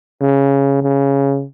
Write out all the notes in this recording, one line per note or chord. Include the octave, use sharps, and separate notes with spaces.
C#3
C#3